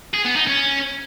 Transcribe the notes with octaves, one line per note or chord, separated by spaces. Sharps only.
G#4
B3
D#4
C#4